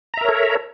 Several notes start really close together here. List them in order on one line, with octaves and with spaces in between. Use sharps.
A#5 E5 A#4 C#5 A4